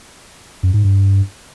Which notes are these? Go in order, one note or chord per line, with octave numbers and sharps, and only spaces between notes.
F#2
G#2
G2